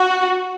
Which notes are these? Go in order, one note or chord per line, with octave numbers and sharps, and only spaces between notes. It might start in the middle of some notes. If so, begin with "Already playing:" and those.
Already playing: F#4